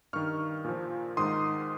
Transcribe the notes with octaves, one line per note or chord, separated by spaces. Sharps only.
G2 D#3 C#6 F6
A#2 F3
G#2 D#3 C6 D#6